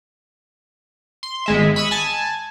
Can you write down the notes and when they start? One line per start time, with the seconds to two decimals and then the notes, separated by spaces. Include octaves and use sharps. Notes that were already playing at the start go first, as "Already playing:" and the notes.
1.23 C6
1.46 G#1 G#3 E5
1.76 B5 C#6 D#6 E6
1.91 G#5 A5